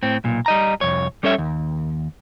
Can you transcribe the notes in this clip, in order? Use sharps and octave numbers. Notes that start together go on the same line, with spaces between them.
A2 C4
B1 A#2
G3 D#5 A#5
C2 F2 C#5
G3 C#4 A4 C#5 E5
D#2